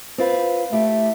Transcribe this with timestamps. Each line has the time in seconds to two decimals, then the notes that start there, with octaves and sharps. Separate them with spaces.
0.18 C4 F4 B4
0.72 A3 E4 G4